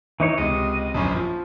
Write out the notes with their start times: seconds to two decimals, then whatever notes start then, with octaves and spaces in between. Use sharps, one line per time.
0.20 E3 D#4 C#5
0.38 C#2 C3 D#5
0.94 A#1 F#2 C#4
1.16 F3